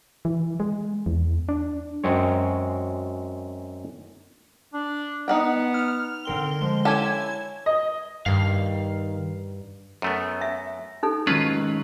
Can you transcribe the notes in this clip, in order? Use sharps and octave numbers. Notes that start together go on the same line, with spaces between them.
E3
G#3
E2
D4
F#2 G#3 C4 C#5
D4
B3 D#4 F#5 G5
F6 F7
D3 C4 A#4 G7
F3 G#3
C#4 E4 G4 A4 G#5 G#6 E7
D#5
G2 D#3 F5
F#2 A3 B3
E5
D#4 A4
D#3 F#3 G#3 C#4 F4 B4